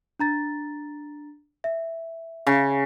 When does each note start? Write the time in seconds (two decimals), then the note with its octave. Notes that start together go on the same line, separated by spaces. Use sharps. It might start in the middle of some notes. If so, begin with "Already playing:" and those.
0.20 D4 A#5 A6
1.64 E5
2.47 C#3